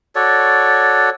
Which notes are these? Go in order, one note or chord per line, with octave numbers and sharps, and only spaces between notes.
F#4 A4 C#5 D5